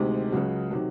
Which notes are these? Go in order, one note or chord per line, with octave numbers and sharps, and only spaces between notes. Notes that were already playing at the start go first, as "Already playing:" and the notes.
Already playing: D2 C3 D#3 G#3
C#2 C#3 F#3
C3 D#3 F#3